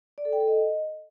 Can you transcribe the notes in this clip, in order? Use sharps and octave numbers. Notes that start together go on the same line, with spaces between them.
D5
A4
G5
A4
D#5